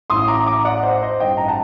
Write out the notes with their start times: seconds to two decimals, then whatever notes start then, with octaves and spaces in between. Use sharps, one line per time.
0.10 A1 A2 C6 D#6
0.28 A#5 D6
0.47 A#5 D6
0.65 D5 F#5
0.83 C5 D#5
1.02 C5 D#5
1.20 A1 G2 D#3 D#5 G5
1.37 A#5
1.48 F#5 A5